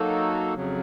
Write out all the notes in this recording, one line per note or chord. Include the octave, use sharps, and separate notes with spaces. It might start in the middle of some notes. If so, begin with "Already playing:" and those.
Already playing: F#3 A#3 D#4 F#4 A4
F2 C#3 F#3